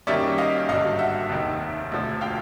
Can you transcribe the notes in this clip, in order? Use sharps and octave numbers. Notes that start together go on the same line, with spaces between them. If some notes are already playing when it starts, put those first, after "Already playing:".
F#2 D#3 G3 A#3 C#4 D5 E5
D#5 F5
G#1 G2 D3 F#3 D#5 F5
E5 F#5
F1 D#2 D#3
E1 D2 D3 F3
F5 G5